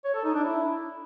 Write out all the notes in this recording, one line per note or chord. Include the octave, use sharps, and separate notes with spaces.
C#5
A4
D#4
D4
E4